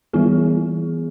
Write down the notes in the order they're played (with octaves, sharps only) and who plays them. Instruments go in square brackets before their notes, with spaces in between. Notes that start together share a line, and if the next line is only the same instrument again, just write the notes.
[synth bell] E3 G3 B3 E4 G#4